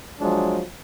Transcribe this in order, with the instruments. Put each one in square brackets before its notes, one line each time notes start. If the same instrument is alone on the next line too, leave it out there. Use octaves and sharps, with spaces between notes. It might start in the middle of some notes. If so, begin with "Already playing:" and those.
[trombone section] F3 F#3 G#3 D4